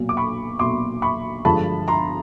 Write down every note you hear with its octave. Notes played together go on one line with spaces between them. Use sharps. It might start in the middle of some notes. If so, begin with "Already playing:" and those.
Already playing: B1 A#2 F#3
D6
B5 C#6
B1 A#2 F#3 C6 D6
B5 C#6
G2 D3 F3 G#3 A5 B5
A#5 C6